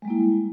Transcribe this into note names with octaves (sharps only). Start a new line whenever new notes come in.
G3 G#3 A#3 E4